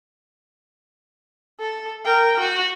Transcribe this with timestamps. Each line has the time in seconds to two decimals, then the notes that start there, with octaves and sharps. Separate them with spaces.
1.60 A4
2.05 A#4 G5
2.40 F#4